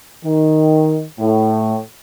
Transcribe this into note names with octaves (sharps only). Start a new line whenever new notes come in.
D#3
A2